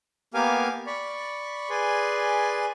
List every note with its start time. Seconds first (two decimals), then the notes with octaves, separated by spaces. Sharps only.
0.34 A#3 B3 G4 A#4 F5 G#5
0.87 D5 B5 C#6
1.70 G#4 B4 D5 G#5 C6